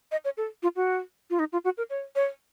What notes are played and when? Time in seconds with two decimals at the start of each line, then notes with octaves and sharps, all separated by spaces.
0.12 D#5
0.25 C#5
0.37 A4
0.63 F4
0.76 F#4
1.30 F4
1.39 D#4
1.53 F4
1.64 F#4
1.78 A#4
1.90 C#5
2.16 C#5